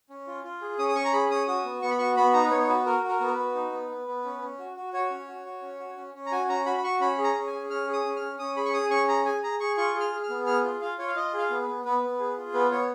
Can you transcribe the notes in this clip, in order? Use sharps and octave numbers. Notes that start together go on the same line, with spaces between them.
C#4
F4
F4
G#4
C#4 D#6
D#6
C#4 C#6
A#5
G#4 B5
C#4 D#6
F#4 D#6
B3
B3 C#6
B5
F#4 C#6
B3 B5
D#4 A#5
B4
B3 C#5
C#5
F#4 B4
F#4 A#4
F#4
A#4
B3
A#4
B4
F#4
D#4
B3
B3
B3
C#4
C#4
F#4
F#4
F#4 C#5
C#4
F#4
F#4
C#4
F#4
C#4
C#4
A#5
F#4 G#5
C#4 A#5
F#4 B5
B5
F#4 C#6
C#4 B5
G#4
A#5
C#4
G#5
G#4
C#4 F6
G#4
D#6
C#4
F6
C#4
C#4 D#6
G#4 B5
C#6
G#4 D#6
C#4 C#6
G#4 A#5
G#4 G#5
G#4 A#5
G#4 C#6
F4 C#6
G#4
F6
G#4
F6
B3
G#4 F6
F4
F4 F5
F4 C#5
F5
F4 D#5
G#4
F5
B3
B4
B3
B3 B4
B3
G#4
F4
B3 B4
B3 C#5